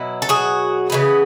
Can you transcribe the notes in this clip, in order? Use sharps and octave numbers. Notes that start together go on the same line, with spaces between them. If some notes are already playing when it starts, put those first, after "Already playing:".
Already playing: B2 F#3 B3 E4
A4
F#4 G#4
C#3 E3 G#3 B3